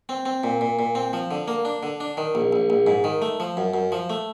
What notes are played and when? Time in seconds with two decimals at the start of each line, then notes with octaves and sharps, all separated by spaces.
0.09 C4
0.26 C4
0.43 A#2
0.61 A#2
0.79 A#2
0.95 C4
1.13 F3
1.31 D3
1.48 A#3
1.65 D4
1.83 D3
2.00 D4
2.17 D#3
2.35 A#1
2.53 A#1
2.70 A#1
2.87 G#2
3.04 D#3
3.22 A3
3.40 F3
3.57 F#2
3.74 F#2
3.92 F3
4.10 A3